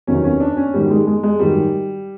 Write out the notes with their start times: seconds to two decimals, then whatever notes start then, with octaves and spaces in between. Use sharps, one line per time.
0.07 E2 C3 D#3 F#3 C#4
0.24 C#4
0.40 D4
0.57 C#4
0.74 G#2 D#3 F#3 G3
0.91 G#3
1.07 G#3
1.23 G#3
1.39 G#2 D#3 F#3 G3